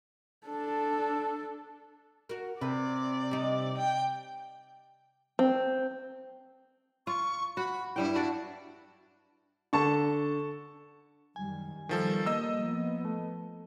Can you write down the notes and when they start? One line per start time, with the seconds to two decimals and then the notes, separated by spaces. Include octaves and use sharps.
0.47 D4 A4
2.29 F#4 A#4
2.61 C3 B4 D5
3.31 G3 D#4
3.77 G5
5.39 C4
7.07 F4 C#6
7.57 F#4 B5
7.96 G2 G3 E4 G5
8.15 D4 F#4 D5
9.73 D3 A4 A5 C#6
11.36 F#2 D#3 G3 G#5
11.89 D#3 F3 G3 B3 A4
12.26 A#3 D#5 E6
12.61 F3 B3
13.05 A3